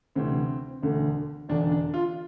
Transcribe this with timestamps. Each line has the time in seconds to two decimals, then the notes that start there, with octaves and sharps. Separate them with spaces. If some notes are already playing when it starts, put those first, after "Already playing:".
0.16 D2 C3 E3 C4
0.82 E1 D2 D3
1.49 E1 E2 D3 D4
1.72 D4
1.94 F4